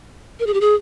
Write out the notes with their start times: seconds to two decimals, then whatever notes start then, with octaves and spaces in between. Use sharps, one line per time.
0.40 A#4
0.47 G#4
0.54 G4
0.61 G#4